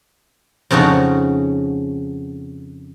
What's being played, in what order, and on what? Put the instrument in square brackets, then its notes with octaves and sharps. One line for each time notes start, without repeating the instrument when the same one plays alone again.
[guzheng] F2 C#3 C#4 D#4 F#4